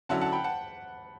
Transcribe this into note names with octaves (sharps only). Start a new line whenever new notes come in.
D3 F#3 C#4 E4 F#5 A5
F#5 A5
G5 B5
F#5 A5